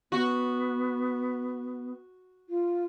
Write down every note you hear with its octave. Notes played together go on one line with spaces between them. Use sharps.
B3 F#4
F4